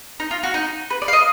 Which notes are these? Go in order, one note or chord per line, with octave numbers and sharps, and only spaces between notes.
D#4
F4
F#4
D#4
B4
D5
F5
D#5